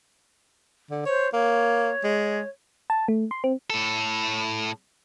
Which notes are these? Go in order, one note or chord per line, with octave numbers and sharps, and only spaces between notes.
D3
C5 C#5
A#3 C#5
G#3
A5
A3
C6
C4
A2 A4